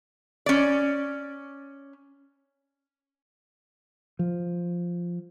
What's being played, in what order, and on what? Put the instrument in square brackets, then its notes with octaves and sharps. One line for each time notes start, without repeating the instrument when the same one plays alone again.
[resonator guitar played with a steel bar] C#4 D5
[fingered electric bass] F3